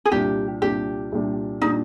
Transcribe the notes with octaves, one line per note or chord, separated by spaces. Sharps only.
G#4
C2 A#2 G3 D4 G4
C2 A#2 G3 D4 G4
C2 A#2 G3 D4
A#2 G3 D4 D#4